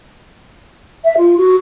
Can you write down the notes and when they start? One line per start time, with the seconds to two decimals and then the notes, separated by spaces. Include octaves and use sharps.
1.04 E5
1.17 F4
1.37 F#4